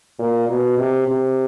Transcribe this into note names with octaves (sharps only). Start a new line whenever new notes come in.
A#2
B2
C3
C3